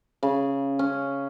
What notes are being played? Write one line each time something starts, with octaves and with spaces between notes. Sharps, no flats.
C#3
C#4